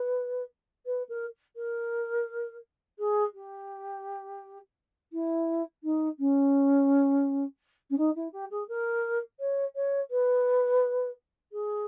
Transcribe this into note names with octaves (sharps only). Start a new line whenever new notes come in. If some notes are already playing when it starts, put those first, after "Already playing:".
Already playing: B4
B4
A#4
A#4
G#4
G4
E4
D#4
C#4
C#4
D#4
E4
G4
G#4
A#4
C#5
C#5
B4
G#4